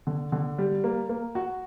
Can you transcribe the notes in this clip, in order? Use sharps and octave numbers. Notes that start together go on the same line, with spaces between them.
D3
D3
G3
A#3
A#3
F#4